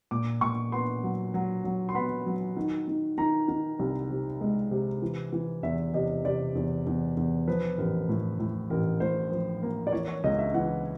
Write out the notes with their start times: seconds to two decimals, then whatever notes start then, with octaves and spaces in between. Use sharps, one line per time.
0.11 A#2 D6
0.41 A#2 C#6
0.72 B3 C6
1.03 F#3
1.34 F#3
1.64 F#3
1.89 C6
1.95 B3 B5
2.26 F#3
2.57 D#3
2.88 D#3
3.18 D#3 A#5
3.48 D#3
3.79 C2
4.10 C3
4.41 G#3
4.71 C3
5.02 E3
5.33 E3
5.63 E2 E5
5.94 C3 D#5
6.25 C3 D5
6.55 E2
6.87 E2
7.17 E2
7.48 F3 B4
7.78 A1 A#4
8.09 A2
8.39 A2
8.70 A1 A#4
9.00 A2 C5
9.31 F3
9.63 A#3
9.87 D5
9.92 E3 C#5
10.08 C#5
10.24 C#2 D#5
10.39 E5
10.54 E3 F#5